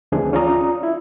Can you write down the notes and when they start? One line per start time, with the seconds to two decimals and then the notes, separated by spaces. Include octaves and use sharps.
0.12 D2 E3 C4 D4 G#4
0.33 C#4 F4 D5 A#5 D#6
0.83 E4